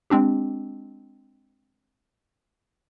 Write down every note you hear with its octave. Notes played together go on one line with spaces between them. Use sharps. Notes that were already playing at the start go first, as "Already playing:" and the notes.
G#3 C4 D4 G4